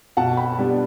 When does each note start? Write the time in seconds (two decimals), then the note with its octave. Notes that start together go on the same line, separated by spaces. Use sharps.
0.17 B2 F#5 A5
0.37 G5 B5
0.58 G3 B3 D4